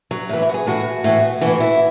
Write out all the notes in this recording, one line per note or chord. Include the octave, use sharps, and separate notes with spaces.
F#3
A2 E3
E4
F#4
G#4
A2 E3 F#4
A2 E3
A2 E3 F#4
E4